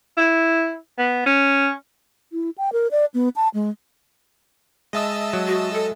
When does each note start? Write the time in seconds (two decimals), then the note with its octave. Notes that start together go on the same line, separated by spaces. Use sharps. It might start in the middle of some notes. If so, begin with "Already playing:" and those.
0.17 E4
0.98 B3
1.26 C#4
2.31 E4
2.58 G5
2.73 A#4
2.91 D5
3.14 B3
3.36 A5
3.54 G#3
4.93 G#3 D#5 E5 A5 D#6 E6
5.33 F#3
5.47 F#4
5.73 A4